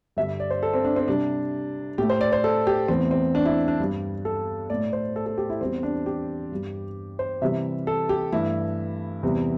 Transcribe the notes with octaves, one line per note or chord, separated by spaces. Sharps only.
G2 D3 G3 E5
D5
C5
A4
C4
D4
C4
C3 G3 D4
A2 A3 G4
C5
D5
C5
A4
G4
E2 E3 A3 C4
C4
D4
E4
D4
G2 G3
A4
A2 A3 D5
C5
A4
A4
G4
E4
E2 E3 G3 C4
D4
G4
G2 G3
C5
C3 E3 G3 E5
A4
G4
G2 E3 A3 E4
E2 C3 E3 G3